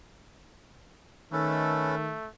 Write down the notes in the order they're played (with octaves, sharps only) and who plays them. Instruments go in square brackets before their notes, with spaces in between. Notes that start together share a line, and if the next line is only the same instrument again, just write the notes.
[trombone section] D#3 [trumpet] A3 [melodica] C#4 A4 B4